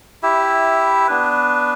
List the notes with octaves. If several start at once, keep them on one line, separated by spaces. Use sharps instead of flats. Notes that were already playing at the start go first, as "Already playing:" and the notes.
E4 G4 E5
B3 D4 B4